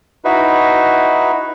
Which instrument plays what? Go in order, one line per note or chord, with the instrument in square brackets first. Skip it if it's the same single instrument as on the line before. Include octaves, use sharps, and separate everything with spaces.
[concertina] D#4 E4 F#4 B4